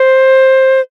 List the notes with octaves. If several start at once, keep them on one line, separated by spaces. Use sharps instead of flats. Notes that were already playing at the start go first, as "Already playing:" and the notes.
Already playing: C5